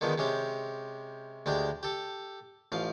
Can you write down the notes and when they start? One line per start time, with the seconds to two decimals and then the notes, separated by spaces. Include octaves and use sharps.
0.01 D3 D#3 F3 G#3 B3
0.18 C3 G#3 C#4 G4
1.46 D2 G#3 D4 G4 G5
1.83 G4 A4
2.72 A1 F3 F5